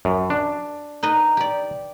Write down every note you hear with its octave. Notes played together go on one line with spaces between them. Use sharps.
F#2
D4
D#4 B4 D#5
G4 D5